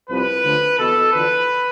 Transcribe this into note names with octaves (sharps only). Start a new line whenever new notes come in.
C2 C3 F3 B4
D2 D3 F3
E2 B2 A4
E2 D3 F3 B4